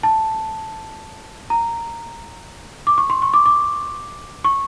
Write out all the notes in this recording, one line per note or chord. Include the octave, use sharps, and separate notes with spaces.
A5
A#5
D6
C#6
C6
C#6
D6
D6
C#6